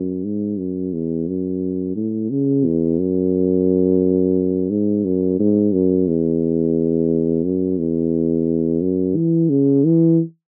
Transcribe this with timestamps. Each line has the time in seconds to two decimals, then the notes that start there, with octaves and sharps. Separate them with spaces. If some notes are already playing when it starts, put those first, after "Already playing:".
Already playing: F#2
0.24 G#2
0.59 F#2
0.93 E2
1.28 F#2
1.96 A2
2.30 C#3
2.65 E2
2.99 F#2
4.70 G#2
5.05 F#2
5.39 G#2
5.73 F#2
6.07 E2
7.44 F#2
7.78 E2
8.81 F#2
9.16 E3
9.49 C#3
9.84 E3